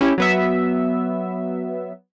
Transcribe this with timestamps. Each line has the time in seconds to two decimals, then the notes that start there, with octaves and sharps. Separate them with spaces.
0.01 C#4 E4 G4
0.18 F#3 B3 E5